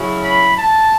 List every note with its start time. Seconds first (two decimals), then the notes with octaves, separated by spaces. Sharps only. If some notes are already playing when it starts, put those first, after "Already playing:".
Already playing: C#3 F#3 C#4 E4
0.24 B5
0.56 A5